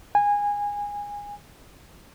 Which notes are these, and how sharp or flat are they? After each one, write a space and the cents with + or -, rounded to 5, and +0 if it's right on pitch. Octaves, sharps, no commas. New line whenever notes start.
G#5 -20